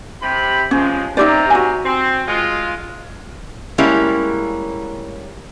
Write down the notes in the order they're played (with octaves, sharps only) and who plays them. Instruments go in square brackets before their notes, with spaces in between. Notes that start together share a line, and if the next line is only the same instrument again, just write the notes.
[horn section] C3 B5
[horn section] C3 F3 G#3 [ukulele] C#4
[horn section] C3 E5 A#5 [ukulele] D#4 G4 D5
[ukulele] F#4 G#5
[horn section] C4
G#3 F4
[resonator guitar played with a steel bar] G3 G#3 A#3 C#4 E4